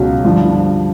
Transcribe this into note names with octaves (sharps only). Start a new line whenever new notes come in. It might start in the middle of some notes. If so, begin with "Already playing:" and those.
Already playing: C#2 B2 F#3
G2 D3 F3